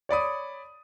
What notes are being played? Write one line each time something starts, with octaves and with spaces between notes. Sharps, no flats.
C#5 D5 B5 D#6